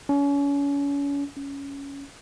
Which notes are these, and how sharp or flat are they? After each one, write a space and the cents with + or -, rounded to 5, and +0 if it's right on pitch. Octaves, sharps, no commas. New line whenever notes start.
C#4 +35
C#4 +10